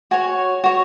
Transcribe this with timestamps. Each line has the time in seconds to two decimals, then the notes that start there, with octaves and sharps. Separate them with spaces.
0.11 F#4 C#5 G#5
0.64 F#4 C#5